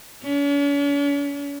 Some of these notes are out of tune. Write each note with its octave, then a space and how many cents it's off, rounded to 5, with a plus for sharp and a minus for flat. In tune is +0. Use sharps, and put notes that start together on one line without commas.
C#4 +45